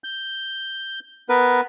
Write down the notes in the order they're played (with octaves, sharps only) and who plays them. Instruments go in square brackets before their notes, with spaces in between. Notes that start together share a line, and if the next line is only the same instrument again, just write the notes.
[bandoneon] G6
B3 A#4 B4